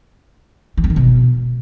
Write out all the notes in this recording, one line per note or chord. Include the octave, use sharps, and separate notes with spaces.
E3
C4
D#3
B2